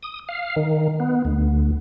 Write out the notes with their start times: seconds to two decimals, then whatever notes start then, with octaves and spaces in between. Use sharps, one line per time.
0.03 D#6
0.29 F5
0.56 D#3
1.00 B3
1.25 D2